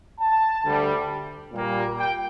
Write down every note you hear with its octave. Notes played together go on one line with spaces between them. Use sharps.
A5
D2 D3 G3
A#2 G3 A#3
G5